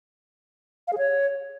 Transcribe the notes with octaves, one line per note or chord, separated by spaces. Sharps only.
F5
G#4
C#5